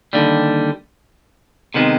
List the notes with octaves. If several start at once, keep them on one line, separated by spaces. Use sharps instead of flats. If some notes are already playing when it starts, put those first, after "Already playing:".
D#2 D3 G3
C3 D#3 G#3 B3